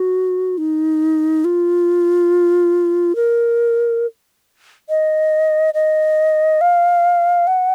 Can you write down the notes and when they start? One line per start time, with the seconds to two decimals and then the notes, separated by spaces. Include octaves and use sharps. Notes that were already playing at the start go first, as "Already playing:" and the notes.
Already playing: F#4
0.58 D#4
1.45 F4
3.16 A#4
4.89 D#5
5.74 D#5
6.61 F5
7.47 F#5